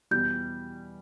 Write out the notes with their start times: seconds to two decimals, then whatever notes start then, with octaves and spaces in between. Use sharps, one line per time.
0.11 E2 B2 G3 G6